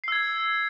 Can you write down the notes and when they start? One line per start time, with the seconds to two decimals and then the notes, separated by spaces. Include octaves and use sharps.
0.04 C7
0.08 E6
0.12 G#6